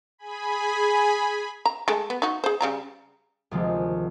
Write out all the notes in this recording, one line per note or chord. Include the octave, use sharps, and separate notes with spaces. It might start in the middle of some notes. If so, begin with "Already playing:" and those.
G#4 G#5 B5
A#5
G#3 A3 A4
B3
D#4 F#4
G#4 C5
C#3 G3 A#5
D2 C3 D#3 F3 G#3 A#3